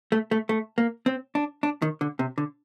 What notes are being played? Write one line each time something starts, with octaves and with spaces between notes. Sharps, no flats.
A3
A3
A3
A#3
C4
D4
D4
D#3
D3
C3
D3